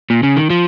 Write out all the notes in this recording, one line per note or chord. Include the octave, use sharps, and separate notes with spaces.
A#2
C#3
D#3
F3